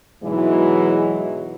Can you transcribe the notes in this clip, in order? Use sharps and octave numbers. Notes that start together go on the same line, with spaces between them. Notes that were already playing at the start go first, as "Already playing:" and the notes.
G#2 B2 E3 F#3 G#3